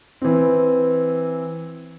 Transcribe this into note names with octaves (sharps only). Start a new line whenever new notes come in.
E3 C4